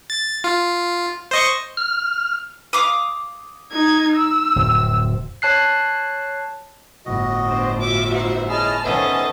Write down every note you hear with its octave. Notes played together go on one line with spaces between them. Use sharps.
A6
F4
C5 D#5 C#6
F6
F5 D6 D#6
D#4 G#6
E6
D1 F2 C3
C#5 A5 F#6 C7
G1 A2 F#4 D#5
B3 D4 C5
F4 F#4 E5 D6
D#4 C5 F#5
C#4 E4 G#4 D#5 A5 F6
D#3 B3 C#4 A4 C5 D#5 E5 A5